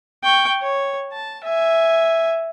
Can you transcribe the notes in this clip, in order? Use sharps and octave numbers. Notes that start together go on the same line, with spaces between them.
G5 C#6
C#5
A5
E5 G#5